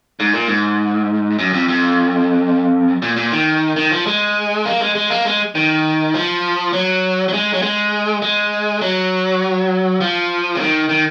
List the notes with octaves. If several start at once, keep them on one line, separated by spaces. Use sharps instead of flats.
G#2
A#2
G#2
F#2
F2
F2
A#2
A#2
D#3
D#3
F3
G#3
A#3
G#3
G#3
A#3
G#3
D#3
F3
F#3
F#3
G#3
F#3
G#3
G#3
F#3
F3
C#3
D#3
D#3